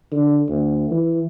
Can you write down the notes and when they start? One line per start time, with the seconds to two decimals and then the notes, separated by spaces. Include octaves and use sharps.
0.12 D3
0.48 D2
0.91 E3